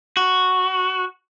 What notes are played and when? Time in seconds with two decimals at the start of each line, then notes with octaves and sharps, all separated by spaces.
0.17 F#4